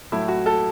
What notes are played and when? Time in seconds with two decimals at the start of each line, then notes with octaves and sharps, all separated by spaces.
0.12 A2 F#3 A3 E4
0.28 F#4
0.46 A4